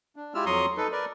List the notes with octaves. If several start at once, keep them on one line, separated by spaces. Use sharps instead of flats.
D4
G#3 E4 F4 G4 E6 F6
F2 F#3 A#5 C6 C#6 D#6
D#4 A4 B4
A#4 B4 D5